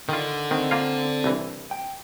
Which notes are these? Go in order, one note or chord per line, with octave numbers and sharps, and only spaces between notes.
D3 D#3 F4
D#3 C4
A#3 F4 F5
C2 E3
G5